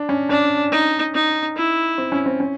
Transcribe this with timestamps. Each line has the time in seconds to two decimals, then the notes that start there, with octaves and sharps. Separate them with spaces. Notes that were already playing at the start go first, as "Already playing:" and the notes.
Already playing: D4
0.09 C#4
0.29 C#4 D4
0.72 D#4
1.15 D#4
1.57 E4
1.98 C4
2.12 C#4
2.26 C4
2.40 C#4